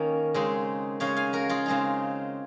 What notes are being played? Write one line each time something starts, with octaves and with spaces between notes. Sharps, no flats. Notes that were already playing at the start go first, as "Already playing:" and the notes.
Already playing: D#3 A#3 C#4
C#3 G#3 C4 D#4
C#3 G#3 C#4 C#5 F5
F5 G#5
F#4 A#4
F4 G#4
C#3 G#3 C4 D#4